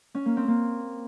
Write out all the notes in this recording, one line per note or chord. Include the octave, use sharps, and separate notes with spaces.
C#4
A#3
C4
A#3